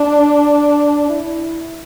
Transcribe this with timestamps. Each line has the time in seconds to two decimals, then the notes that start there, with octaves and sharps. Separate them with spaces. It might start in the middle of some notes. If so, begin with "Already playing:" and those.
Already playing: D4
1.09 E4